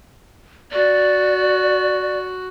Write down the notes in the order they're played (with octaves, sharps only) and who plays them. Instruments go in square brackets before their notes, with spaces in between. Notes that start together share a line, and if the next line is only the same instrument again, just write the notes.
[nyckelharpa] F#4 [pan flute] D5